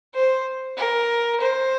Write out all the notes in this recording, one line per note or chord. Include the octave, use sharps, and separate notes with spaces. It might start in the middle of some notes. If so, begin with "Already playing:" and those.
C5
A#4
C5